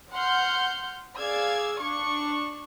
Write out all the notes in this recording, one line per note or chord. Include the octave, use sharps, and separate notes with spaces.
F#5 C6 F6 G6
G#4 D5 F5 E6 G#6
D4 C#6